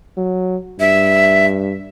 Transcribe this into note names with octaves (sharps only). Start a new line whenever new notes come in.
F#3
G2 E5